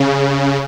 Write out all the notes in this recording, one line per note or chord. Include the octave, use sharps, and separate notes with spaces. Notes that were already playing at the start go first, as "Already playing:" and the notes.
Already playing: C#3